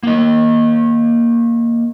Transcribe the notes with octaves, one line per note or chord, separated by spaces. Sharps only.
A#3 D#5